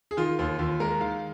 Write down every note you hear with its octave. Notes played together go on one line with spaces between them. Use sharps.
G#4
D#3 F4
D#2 F4
D#2 F4
G#3 A#4
D#3 F5